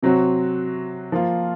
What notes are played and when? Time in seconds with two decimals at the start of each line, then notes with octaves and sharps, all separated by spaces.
0.03 C3 F#3 C4 F#4
1.12 F3 A#3 F4